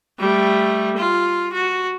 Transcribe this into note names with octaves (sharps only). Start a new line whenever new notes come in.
G3 A3
F4
F#4